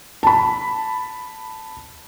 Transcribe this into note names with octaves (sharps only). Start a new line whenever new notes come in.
A5 B5